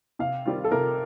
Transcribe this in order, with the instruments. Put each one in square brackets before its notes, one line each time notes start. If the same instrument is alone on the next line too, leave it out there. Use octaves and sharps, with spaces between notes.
[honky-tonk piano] C3 [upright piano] F5
[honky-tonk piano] D#3 G3 C4 F4
[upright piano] A4
[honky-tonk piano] C3 [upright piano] A#4